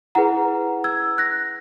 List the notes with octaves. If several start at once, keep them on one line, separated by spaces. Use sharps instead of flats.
E4 G#4 B4 F#5 A#5
E6 G#6
F#6 A#6